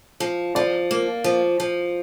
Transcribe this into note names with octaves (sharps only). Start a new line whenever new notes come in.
F3
F3 D5
A#3
F3
F3